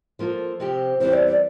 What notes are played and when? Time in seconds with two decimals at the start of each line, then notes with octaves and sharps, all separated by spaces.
0.19 F3 A#3 F4 A4
0.60 C3 F3 C4 G4
1.00 E2 E3 G3 C4 E4 C5
1.13 D5
1.27 D5